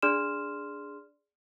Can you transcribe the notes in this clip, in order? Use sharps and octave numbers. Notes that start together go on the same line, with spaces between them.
D4 G#4 D5 C6 F6 E7